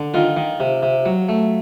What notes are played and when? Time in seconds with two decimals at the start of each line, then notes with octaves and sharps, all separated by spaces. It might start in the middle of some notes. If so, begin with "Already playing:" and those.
Already playing: D3
0.14 D#3 F4
0.37 D#3
0.60 C3
0.83 C3
1.05 F#3
1.29 A3